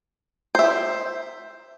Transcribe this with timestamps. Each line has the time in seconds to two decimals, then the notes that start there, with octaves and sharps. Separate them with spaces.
0.55 C5 E5